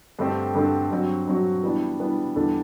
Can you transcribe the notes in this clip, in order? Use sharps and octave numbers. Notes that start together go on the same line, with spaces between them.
G2 D3 A3 C4 G4
G2 D3 A3 C4 G4
G2 F#3 C4 F#4
G2 F#3 C4 F#4
E3 G3 B3 D4
E3 G3 B3 D4
E2 D3 G3 D4 A4